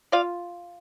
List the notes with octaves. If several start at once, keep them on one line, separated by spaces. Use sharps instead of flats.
F4 D5 F5